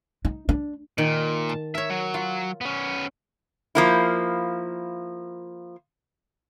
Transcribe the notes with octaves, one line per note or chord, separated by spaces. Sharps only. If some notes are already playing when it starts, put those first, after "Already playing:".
D#4
D4
A#2 D#3
A5
A#4 C#5 E5
F#3
F4
B3 C#4
F3 A#3 E4